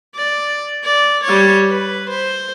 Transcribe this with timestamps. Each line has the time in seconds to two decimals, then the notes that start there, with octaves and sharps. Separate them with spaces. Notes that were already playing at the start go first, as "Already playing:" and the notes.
0.15 D5
0.84 D5
1.24 G3 C#5
1.68 B4
2.10 C5